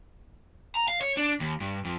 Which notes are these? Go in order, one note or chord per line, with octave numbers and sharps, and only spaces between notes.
A#5
F5
C#5
D4
D#2
G2
F2